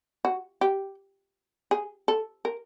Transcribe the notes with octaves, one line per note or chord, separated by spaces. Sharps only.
F#4
G4
G#4
A4
A#4